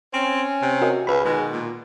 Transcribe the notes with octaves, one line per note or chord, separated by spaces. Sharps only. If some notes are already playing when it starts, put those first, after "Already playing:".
C4 C#4
C3
F#4 A#4 D#5
C#2 B4 B5
B2 D#3 G#3
A#2